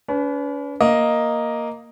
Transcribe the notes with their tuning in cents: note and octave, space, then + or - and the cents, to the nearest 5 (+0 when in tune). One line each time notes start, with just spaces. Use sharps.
C#4 +45 B4 +10
A#3 +0 D#5 +0